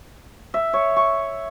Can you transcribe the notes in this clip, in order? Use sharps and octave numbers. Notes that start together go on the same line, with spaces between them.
E5
C#5
C#6